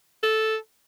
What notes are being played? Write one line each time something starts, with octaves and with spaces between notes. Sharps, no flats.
A4